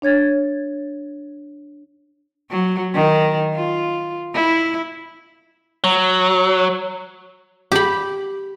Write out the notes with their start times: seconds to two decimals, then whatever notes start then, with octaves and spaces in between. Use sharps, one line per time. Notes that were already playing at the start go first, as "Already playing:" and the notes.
0.02 D4 C#5 G#6 A6
2.50 F#3
2.94 D#3
3.55 F4
4.34 E4
5.84 F#3
7.72 G4 B5